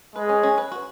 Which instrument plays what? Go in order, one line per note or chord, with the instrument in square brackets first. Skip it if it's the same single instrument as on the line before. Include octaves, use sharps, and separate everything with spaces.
[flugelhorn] G#3 [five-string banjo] B4
[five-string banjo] C#4
C#4
B4
F#4